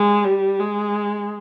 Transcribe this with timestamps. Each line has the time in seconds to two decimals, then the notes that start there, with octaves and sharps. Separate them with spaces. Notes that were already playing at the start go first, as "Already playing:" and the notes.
Already playing: G#3
0.24 G3
0.60 G#3